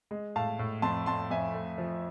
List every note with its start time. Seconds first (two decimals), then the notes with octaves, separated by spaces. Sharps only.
0.11 G#3
0.36 A2 F5 A5
0.59 A2
0.82 F2 A5 C6
1.06 F2 A5 C6
1.30 F2 E5 G#5
1.54 A3
1.78 F3